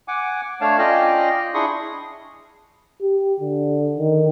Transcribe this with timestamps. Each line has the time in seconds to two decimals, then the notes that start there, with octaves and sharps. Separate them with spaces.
0.08 F#5 G#5 D6
0.61 A3 D4 C#5 F5 A5
0.78 C#4 F4 D5 D#5 F5 G5
1.54 D4 E4 G#4 C6 C#6 D#6
3.02 G4
3.40 D3
3.97 D#3